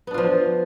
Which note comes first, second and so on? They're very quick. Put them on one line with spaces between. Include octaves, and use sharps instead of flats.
B3 D4 F4 F3